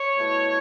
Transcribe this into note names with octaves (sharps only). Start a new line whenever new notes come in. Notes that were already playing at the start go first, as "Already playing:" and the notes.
Already playing: C#5
B2 A3 E4